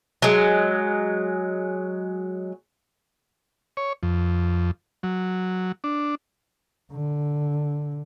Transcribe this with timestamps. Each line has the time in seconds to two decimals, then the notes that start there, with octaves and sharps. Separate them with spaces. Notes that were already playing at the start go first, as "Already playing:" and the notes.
0.22 F#3 G#3
3.77 C#5
4.03 F2
5.03 F#3
5.84 D4
6.92 D3